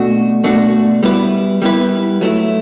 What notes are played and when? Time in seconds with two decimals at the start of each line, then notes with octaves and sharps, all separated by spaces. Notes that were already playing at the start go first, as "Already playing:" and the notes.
Already playing: B2 A3 D4 F#4
0.44 B2 A3 D4 F#4
1.03 G3 B3 E4 B4
1.62 G3 B3 E4 B4
2.21 F#3 A3 E4